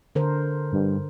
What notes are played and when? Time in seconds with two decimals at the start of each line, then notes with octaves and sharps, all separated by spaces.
0.15 D3 A#4 C5
0.72 G2